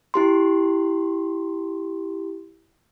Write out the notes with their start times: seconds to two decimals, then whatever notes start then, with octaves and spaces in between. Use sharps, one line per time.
0.14 E4 G4 C6